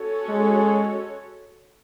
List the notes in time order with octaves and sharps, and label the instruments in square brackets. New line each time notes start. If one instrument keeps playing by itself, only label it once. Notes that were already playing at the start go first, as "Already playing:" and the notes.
Already playing: [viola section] C#4 F#4 A4 C#5
[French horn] G#3